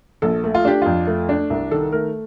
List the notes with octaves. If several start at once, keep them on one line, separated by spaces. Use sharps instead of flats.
A#1 A4
A3
F4
D4 G4
F2 F4
A3
D4
C2
D#3 A4
A3 A#4